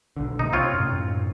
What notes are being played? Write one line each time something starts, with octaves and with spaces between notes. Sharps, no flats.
B1 D3
C3 A#3 D#4
C4 F4 C#5
F#2 A2